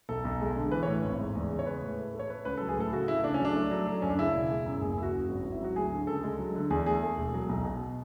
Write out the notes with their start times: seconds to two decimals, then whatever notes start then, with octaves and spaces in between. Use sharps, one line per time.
0.09 B1 A4
0.25 B1
0.41 G#3
0.56 D3
0.71 E3 B4
0.83 C#5
0.87 A2
1.04 G#1
1.20 G#2
1.35 E2
1.51 C#3
1.59 C#5
1.66 G#3 B4
1.82 A2
1.98 A3
2.14 A3
2.19 C#5
2.29 A3 B4
2.45 C#2 B4
2.57 F#3 A4
2.69 G#4
2.77 A2 A4
2.93 C#3 F#4
3.08 C#3 E4
3.24 A3 D4
3.34 C#4
3.40 F#3 D4
3.56 A3
3.71 F#3
3.87 F#3
4.02 F#2 C#4
4.10 D4
4.19 C#3 E4
4.34 E1
4.50 G#3
4.66 F#2
4.81 F#1 G#4
4.92 G#4
4.98 F#1 E4
5.03 F#4
5.13 F#2
5.29 G#1
5.44 G#1
5.52 E4
5.60 F#3 F#4
5.76 D2 G#4
5.92 D3
6.07 C#2 A4
6.24 G#3
6.39 F#3
6.55 D3
6.70 E2 G#4
6.86 A3 G#4
7.03 A3
7.18 E1
7.34 F#3
7.49 B1
7.65 B2